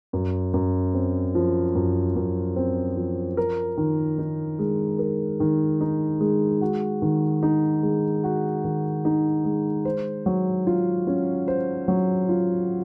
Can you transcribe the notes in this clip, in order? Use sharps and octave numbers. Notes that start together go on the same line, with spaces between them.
F#2
F#2
C4
F3
F#2
F#2
C4
F3
A#4
D#3
D#4
G#3
A#4
D#3
D#4
G#3
F#4
D#3
D#4
G#3
F#4
D#3
D#4
G#3
C5
F#3
F4
C#4
C5
F#3
F4